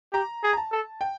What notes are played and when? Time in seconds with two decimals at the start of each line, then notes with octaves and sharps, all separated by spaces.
0.13 G4 A#5
0.43 G#4
0.53 A#5
0.57 A5
0.72 A4
1.01 G5